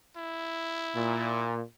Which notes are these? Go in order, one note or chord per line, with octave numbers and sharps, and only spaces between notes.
E4
A#2